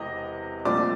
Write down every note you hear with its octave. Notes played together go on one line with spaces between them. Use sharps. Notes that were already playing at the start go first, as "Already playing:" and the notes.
Already playing: E1 E2 C3 E3 D#5
C2 A#2 F3 A3 C4 D5 D6